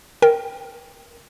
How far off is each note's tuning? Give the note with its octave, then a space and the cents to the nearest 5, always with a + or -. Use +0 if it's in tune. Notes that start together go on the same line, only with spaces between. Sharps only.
A#4 +0 G5 +0